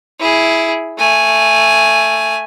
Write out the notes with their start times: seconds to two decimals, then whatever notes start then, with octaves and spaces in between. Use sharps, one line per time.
0.20 E4 G#4
0.99 A3 G#5